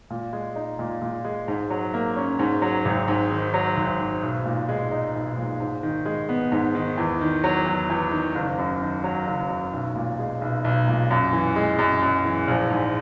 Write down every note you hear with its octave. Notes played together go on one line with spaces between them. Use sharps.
A#2
G#3
D#4
A#2
A#2
G#3
G#2
F#3
A#3
C#4
G#2
F#3
G#1
G#2
D#3
F#3
G#1
G#2
B1
A#2
G#3
D#4
B1
A#2
G#2
D#3
G#3
B3
G#2
D#3
E2
D#3
F#3
E2
E2
D#3
F#1
F#2
D#3
F#3
F#1
F#2
B1
A#2
G#3
B1
B1
A#2
F#2
E3
G#3
F#2
F#2
E3
A#1
G#2